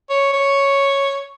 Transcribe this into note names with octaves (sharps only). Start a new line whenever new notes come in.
C#5
C#5